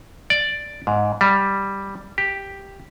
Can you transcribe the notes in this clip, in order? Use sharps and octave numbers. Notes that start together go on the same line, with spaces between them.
D5
G#2
G3
G4